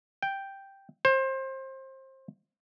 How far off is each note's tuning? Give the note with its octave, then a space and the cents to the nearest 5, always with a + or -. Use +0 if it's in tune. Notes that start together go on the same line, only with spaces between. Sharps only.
G5 +0
C5 +25